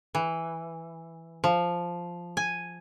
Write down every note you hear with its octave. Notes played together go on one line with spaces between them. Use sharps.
E3
F3
G#5